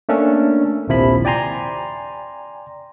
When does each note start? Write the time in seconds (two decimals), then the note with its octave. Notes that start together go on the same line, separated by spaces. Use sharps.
0.09 A3 A#3 C#4 D4 A4
0.88 A#1 D#2 C3 F3 E4 B5
1.25 D5 G5 G#5 A#5 C6